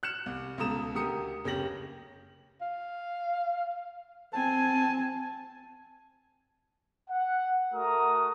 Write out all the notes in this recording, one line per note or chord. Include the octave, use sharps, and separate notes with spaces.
F6 F#6 C#7 E7
C2
C#2 B2 A4 A#5 D#6 E7
D2 G4 A#4 D#6 C#7
F#1 C#3 C#4 G4 A#6 F#7
F5
C4 G#5 A5
F#5
A3 F#4 A#4 A#5 D#6